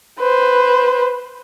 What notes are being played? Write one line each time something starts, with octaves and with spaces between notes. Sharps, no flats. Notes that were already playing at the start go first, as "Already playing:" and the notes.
B4 C5